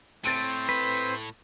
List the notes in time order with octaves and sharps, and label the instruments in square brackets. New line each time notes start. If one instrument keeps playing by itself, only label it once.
[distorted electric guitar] A2 A3 [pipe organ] C4 C5 [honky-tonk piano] A6 D7 D#7
[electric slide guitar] B4